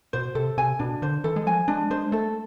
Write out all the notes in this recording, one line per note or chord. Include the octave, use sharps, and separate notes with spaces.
B2 C5
C3 A4
C3 G#5
B2 D4
D3 C5
E3 A4
G#3
F3 G#5
G#3 D4
G#3 C5
A3 A4